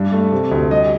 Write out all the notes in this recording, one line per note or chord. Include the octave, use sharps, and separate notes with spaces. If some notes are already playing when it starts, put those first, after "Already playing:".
Already playing: G2
A3
C3
D2
G3 D#5